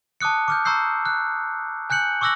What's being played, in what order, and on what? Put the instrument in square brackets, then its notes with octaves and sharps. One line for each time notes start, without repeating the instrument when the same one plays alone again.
[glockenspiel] A5 D6 D#6 F#6 C#7
D6 F6 G6
A#5 C#6 E6 G6 C7
F#6
G#5 F#6 G6 C#7 F#7
C#6 D6 E6 F#6 A#6 F#7